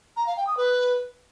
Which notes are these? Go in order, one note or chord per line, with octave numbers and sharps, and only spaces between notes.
A#5
F5
G5
D#6
B4